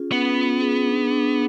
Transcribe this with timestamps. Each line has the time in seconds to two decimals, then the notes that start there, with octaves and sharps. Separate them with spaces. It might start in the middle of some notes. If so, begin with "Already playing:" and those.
Already playing: C#4 F4 G#4
0.12 B3 C#4
0.37 F4
0.62 G#4
0.86 D4
1.10 D4